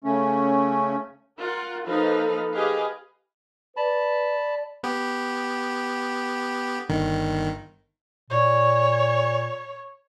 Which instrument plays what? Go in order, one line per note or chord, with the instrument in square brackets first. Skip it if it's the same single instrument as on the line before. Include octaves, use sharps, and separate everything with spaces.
[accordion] C#3 A3 C#4
[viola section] F4 A#4 F#5
F3 A#3 D#4 A4 B4 F5
G4 G#4 B4 D#5 F5
[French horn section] B4 [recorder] D5 [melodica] A5 B5
[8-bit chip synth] B3 G4
G1 D#3
[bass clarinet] A#2 [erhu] C#5